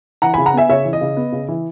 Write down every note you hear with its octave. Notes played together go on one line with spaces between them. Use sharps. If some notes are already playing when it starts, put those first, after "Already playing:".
E3 F#5 A#5
G#5 B5
C#3
F#5 A#5
B3 E5 G#5
C#3 C#5 E5
E3
D#5
C#3
B3
C#3
E3